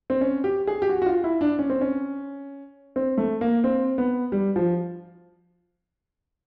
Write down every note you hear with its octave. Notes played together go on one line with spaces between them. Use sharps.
C4
C#4
G4
G#4
G4
F#4
F#4
F4
E4
D4
C#4
C4
C#4
C4
A3
A#3
C4
B3
G3
F3